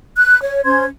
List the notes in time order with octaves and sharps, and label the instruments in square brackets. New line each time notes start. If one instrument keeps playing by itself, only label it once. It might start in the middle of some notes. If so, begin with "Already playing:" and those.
[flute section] F#6
C#5
C#4 C5 C6 G#6